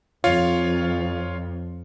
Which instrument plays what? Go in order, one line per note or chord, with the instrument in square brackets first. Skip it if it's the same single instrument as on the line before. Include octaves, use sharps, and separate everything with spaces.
[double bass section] F2 [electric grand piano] F4 C#5 F5